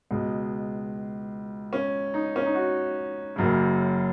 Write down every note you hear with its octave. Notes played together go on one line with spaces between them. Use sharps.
C#2 B2 G#3
C#4
D#4
C#4
D#4
F#4
F#1 F#2 C#3